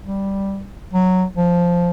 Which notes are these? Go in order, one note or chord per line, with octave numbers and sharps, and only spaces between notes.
G3
F#3
F3